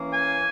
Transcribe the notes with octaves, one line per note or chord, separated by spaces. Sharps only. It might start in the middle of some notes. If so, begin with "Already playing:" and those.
Already playing: E3 A#3 C#4
G#5